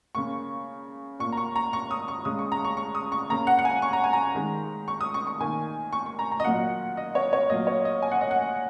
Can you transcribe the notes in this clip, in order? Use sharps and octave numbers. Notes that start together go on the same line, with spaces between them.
C#3 A#3 C#6
A#2 A#3 C#6
A#5
C#6
A#5
C#6
D#6
C#6
C#3 G#3 D#6
C#6
A#5
C#6
C#6
D#6
C#6
C#3 A#3 A#5
F#5
F#5
G#5
C#6
A#5
G#5
A#5
D#3 G#3
C#6
D#6
C#6
C#6
D#3 A#3 G#5
C#6
C#6
A#5
A#5
D#5
A#2 F#3 A#3 F#5
D#5
C#5
C#5
A#2 F#3 A#3 D#5
C#5
D#5
G#5
F#5
D#5
F#5